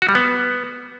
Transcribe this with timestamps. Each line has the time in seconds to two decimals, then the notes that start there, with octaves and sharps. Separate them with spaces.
0.02 F#4
0.09 G3
0.15 B3